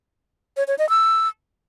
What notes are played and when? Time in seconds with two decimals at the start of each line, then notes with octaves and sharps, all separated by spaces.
0.57 C#5
0.68 C#5
0.78 D#5
0.89 E6